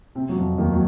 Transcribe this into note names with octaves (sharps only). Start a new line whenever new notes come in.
C3 C4
F#3
F2 F3
D#2 D#3
F#3